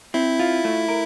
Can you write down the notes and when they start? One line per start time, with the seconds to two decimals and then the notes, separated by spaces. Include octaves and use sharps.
0.14 C4 E4
0.39 F4
0.65 A3
0.89 A#4